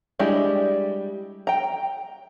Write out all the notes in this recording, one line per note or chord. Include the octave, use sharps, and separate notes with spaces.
G3 G#3 D4 E4 G4
G5 A#5